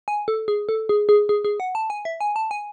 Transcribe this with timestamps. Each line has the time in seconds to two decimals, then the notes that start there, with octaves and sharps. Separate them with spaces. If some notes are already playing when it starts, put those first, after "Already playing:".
0.08 G#5
0.28 A4
0.48 G#4
0.69 A4
0.89 G#4
1.09 G#4
1.29 G#4
1.45 G#4
1.60 F#5
1.75 A5
1.90 G#5
2.05 E5
2.21 G#5
2.36 A5
2.51 G#5